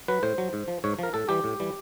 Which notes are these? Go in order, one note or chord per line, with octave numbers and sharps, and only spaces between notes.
F#3 B4
A2 C5
F#3
G#2
F3
G#2 C#5
F3 A#4
A2 A4
E3 G3 G4
A2
E3 G3